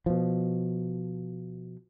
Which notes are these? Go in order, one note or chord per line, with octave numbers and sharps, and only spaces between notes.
B2 F3